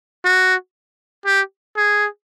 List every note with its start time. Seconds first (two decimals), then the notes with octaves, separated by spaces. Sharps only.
0.25 F#4
1.26 G4
1.77 G#4